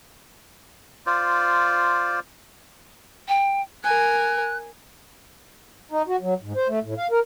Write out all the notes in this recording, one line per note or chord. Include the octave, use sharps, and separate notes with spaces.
F4 C5 D5
G5
A#4 G#5 F#6
D#4
F#4
F#3
G#2
C5
A3
A2
F5
A#4